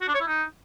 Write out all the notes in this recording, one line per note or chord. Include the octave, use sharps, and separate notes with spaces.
F#4
D4
C#5
E4
D#4